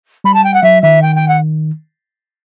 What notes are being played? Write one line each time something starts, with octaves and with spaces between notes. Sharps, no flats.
G3 B5
A5
G5
F#5
F#3 E5
D#3 E5
G5
G5
F#5